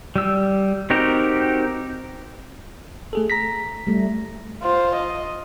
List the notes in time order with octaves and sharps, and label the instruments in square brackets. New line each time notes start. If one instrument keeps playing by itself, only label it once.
[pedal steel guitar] G3 E6
C4 D#4 F#4 G4 A#4
[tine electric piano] A3 G#4 A4
A#5 A#6 B6
[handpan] G3 A3
[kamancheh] F4 C5
D#5